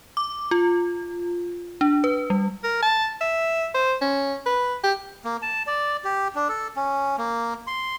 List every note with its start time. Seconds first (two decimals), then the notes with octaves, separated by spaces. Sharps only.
0.17 D6
0.51 F4
1.81 D4
2.04 B4
2.30 G3
2.64 A#4
2.83 A5
3.21 E5
3.74 C5
4.01 C#4
4.46 B4
4.84 G4
5.25 A#3
5.42 A5
5.67 D5
6.04 G4
6.35 D4
6.49 A4
6.76 C#4
7.18 A#3
7.67 C6